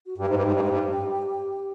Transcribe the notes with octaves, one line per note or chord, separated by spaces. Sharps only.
F#4
G2 G4
G#2
G2
G#2
G2
G#2
G2